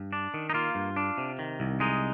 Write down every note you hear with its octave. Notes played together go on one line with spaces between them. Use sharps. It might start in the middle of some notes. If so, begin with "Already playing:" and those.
Already playing: G2
D4
D#3
D#4
A#3 F4
G2
D4
C3
D#3
C2
G#3 D#4